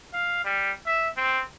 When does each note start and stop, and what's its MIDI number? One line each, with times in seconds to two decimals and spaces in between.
0.13 0.41 77
0.45 0.71 55
0.86 1.08 76
1.17 1.42 60